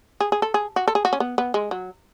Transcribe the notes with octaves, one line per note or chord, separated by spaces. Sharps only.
G#4
G#4
A4
G#4
F#4
A4
G#4
F#4
C#4
B3
B3
G#3
F#3